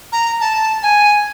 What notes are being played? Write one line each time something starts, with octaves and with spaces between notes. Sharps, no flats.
A#5
A5
G#5